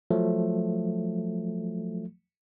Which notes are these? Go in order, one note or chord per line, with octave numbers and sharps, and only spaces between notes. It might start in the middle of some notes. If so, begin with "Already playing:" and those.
F3 F#3 A3